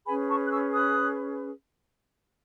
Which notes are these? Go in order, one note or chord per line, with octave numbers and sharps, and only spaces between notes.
C#4 G#4 B4 G#5 B5
A5 C#6
F#6
C#6 E6
D#6 F#6